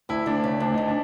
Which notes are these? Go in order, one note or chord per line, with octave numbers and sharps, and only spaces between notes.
D2 E4
D2 D4
C#3
D2 D4
D2 D#4
D4